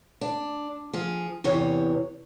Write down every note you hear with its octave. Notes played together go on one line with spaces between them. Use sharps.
D4
F3 G#4
E2 C3 E3 C#5